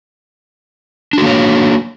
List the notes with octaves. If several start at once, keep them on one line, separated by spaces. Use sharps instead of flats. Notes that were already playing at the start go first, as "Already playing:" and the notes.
A#3 D4 F#4 C#5